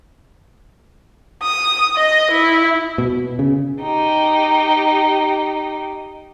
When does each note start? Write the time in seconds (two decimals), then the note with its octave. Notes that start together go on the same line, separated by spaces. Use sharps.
1.42 D#6
1.96 D#5
2.31 E4
2.98 B2
3.39 C#3
3.82 D#4 G4